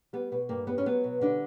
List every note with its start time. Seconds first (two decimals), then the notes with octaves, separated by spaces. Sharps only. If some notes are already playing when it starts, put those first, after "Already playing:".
0.13 G3 B3
0.32 B2 B3
0.49 G2 A#3
0.67 G3 B3
0.78 C#4
0.86 F#3 B3
1.04 B2
1.21 D3 G3 D4